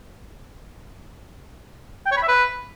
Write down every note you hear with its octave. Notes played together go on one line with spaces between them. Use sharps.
G5
C#5
B5
E5
B4